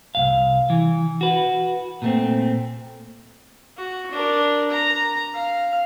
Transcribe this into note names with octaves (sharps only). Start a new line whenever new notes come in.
C2 G2 F5
E3
F#4 B4
A#2 A3 C4
F#4
D4 A#4
A#5
F5